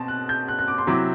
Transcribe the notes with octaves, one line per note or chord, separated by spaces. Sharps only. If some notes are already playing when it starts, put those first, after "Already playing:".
Already playing: B2 C4 A5
F#6
G6
F#6
F#6
D6
C6
C3 F#3 C4 E4 D6